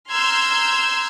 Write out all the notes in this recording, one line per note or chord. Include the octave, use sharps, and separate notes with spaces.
A#5 C6 E6 F6 G6 G#6